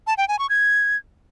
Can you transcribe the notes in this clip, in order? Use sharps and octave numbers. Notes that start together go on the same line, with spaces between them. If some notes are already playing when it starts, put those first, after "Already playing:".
A5
G5
G#5
C#6
G#6